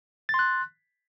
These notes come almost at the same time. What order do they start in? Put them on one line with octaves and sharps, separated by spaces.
A6 C6 F#6